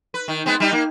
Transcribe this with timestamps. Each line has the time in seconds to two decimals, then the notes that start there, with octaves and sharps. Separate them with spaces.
0.14 B4
0.28 D#3
0.46 G#3 B3 C4
0.60 G3 D#4 G4
0.73 A#3